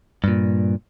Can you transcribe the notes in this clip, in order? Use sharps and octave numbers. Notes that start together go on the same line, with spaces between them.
G2 A#2